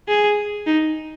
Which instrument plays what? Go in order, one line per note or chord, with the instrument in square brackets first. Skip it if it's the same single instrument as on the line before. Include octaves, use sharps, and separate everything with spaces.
[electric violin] G#4
D#4